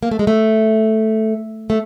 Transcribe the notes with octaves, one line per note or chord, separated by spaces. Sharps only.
A#3
A3
G#3
A3
A3